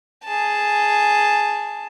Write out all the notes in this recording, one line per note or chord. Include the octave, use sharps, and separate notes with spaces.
G#4 A5